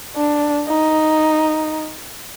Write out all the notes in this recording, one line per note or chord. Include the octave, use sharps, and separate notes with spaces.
D4
D#4